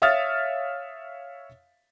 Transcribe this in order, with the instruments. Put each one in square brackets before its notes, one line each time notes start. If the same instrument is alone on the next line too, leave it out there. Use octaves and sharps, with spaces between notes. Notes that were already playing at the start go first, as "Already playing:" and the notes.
[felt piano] C#5 E5 F5 D#6 F6 A6